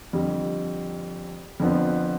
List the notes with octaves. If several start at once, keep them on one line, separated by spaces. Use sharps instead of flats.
F2 D3 G3
F2 D3 F3 B3